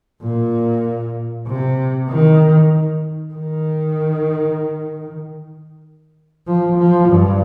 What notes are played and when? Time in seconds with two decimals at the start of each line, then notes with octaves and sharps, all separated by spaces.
0.22 A#2
1.47 C3
2.09 D#3
3.34 D#3
6.47 F3
6.78 F3
7.10 G2